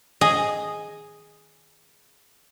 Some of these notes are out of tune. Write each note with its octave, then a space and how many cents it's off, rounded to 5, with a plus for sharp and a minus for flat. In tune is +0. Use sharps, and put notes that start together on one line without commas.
G#4 +0 D#5 +0